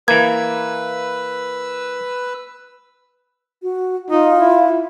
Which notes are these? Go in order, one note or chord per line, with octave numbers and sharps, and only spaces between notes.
E3 A#3 B4 E6 G#6
F#4
D#4 F4
E4